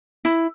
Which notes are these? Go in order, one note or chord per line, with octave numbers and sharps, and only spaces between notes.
E4